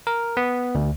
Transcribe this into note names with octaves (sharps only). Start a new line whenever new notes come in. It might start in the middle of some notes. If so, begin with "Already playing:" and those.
A#4
B3
D2